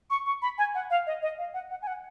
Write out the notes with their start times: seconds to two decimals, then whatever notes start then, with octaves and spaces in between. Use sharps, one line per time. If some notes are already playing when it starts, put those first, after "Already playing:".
0.10 C#6
0.26 C#6
0.42 B5
0.58 G#5
0.75 F#5
0.90 F5
1.07 D#5
1.22 D#5
1.38 F5
1.54 F#5
1.70 F#5
1.82 G#5
1.87 F#5